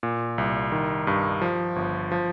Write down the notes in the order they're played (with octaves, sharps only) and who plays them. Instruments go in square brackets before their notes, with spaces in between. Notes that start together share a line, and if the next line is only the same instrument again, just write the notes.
[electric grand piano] A#2
C2
D#3
G2
F3
G1
F3